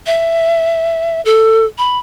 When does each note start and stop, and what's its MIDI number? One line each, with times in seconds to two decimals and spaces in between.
0.06 1.21 76
1.25 1.65 69
1.78 1.98 83